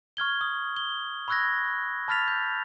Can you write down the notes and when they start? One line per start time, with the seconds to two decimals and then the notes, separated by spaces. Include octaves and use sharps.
0.17 C#6 F6 G#6 G7
0.41 D#6
0.76 G7
1.28 B5 C#6 E6 F#6 G#6 A#6
2.08 A5 B5 F6 A6 B6 F7
2.28 G6